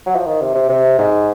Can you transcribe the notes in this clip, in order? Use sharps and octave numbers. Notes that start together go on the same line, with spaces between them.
F#3
F3
D#3
C3
C3
C3
G#2